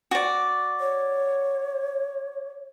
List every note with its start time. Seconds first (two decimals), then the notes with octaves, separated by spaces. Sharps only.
0.11 F#4 D5
0.80 C#5